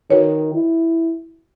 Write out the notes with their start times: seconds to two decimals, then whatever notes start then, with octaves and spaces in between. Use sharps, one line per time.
0.10 D#3 F#4 B4 C#5
0.54 E4